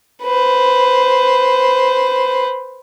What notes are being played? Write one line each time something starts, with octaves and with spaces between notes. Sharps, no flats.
B4 C5